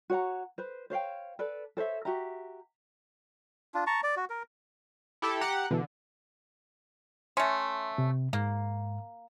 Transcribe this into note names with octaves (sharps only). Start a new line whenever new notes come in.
F#4 C#5 F#5 A#5
B4 C5
C5 C#5 F5 G5
A4 B4 D5
A4 C5 C#5 E5
F#4 G4 E5 A#5
D4 F4
A5 A#5 C#6
D5
F#4
A#4
E4 G4 A4
G4 F#5 A#5
B2 D3 E3
A3 C#4 C6
C3
G#2 A#3